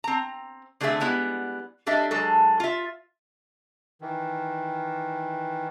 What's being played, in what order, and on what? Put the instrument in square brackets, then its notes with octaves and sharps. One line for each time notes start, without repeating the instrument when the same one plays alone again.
[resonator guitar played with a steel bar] C4 A#5
D3 A3 C4 G#4 A4 E5
G3 G#3 B3 E4
G3 D4 A4 D#5 E5
F#3 G#3 A4
F4 E5
[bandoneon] D#3 E3